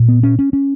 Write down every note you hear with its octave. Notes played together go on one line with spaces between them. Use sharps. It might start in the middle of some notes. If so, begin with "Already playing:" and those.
Already playing: A#2
B3
C#4
C#4
C#4